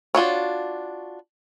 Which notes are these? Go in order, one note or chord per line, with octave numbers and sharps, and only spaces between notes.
D4 F4 F#4 C#5